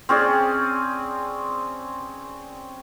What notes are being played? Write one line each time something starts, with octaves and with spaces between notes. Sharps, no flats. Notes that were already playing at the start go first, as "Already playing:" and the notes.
C4 C#4 G#4 D5